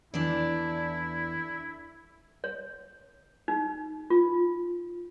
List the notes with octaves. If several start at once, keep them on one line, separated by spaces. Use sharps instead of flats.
E2 E3 D4 E4 A4 D5
C#5
D#4
F4